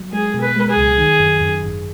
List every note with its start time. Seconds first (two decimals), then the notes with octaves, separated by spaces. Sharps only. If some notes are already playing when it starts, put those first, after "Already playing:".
Already playing: F#3
0.13 G#3 G#4
0.34 B2
0.41 B4
0.56 G#3
0.70 G#4
0.76 C#2
0.98 D#3
1.19 F#2
1.40 F#2
1.63 G#1